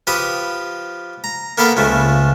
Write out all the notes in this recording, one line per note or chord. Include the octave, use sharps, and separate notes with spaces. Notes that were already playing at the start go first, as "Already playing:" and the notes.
F3 G4 B4 D#6
A#5
A#3 B3 A4 B4 F5 G5
C#2 F3 A3